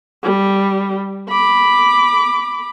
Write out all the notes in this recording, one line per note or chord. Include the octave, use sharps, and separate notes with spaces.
G3
B5 D6